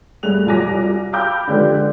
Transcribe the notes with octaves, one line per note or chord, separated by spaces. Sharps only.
G2 A3 G#4 F#6 F7
C2 F2 F#3 G#5 D6 A#6
F5 G5 B5 D6 E6 G6
D3 F3 G#3 D4 G4 B4